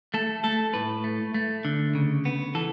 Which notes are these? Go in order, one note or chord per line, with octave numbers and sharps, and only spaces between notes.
A3 A4
A3 A4
A2 B4
A3
A3
D3
C#3
B3
E3 A4